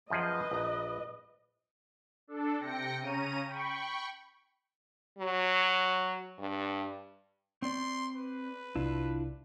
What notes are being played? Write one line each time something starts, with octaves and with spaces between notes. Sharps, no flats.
F#2 F3 G#4 B4 D#5
A#1 A#5
D4 A4
C3 G5 A#6 C#7
C#3 C#4 A#5 D#7
G5 B5 C#6
F#3
G2
C4 D5 C6
B4
C2 D4 E4 F4